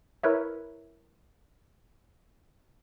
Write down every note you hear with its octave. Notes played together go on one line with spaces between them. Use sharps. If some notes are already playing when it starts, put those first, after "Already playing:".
E4 A#4 B4 C#5 E5